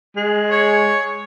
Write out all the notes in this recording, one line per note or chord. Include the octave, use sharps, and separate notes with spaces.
G#3
C#5